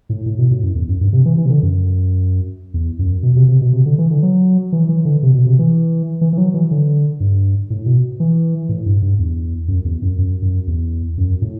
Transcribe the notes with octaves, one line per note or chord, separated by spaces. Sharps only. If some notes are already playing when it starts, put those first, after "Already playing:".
A2
A2
B2
A2
F#2
E2
F#2
G2
C3
E3
E3
C3
D3
F#2
E2
F#2
B2
C3
C3
B2
C3
D3
E3
D3
F#3
E3
E3
D3
C3
B2
C3
E3
E3
E3
F#3
E3
D3
G2
A2
B2
E3
A2
G2
G2
E2
F#2
E2
F#2
F#2
F#2
E2
F#2
A2